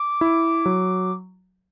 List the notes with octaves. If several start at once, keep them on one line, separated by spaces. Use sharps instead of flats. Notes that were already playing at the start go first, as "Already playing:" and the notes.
Already playing: D6
E4
F#3